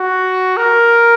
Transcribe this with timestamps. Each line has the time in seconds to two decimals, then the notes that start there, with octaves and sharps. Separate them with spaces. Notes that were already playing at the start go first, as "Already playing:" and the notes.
Already playing: F#4
0.57 A#4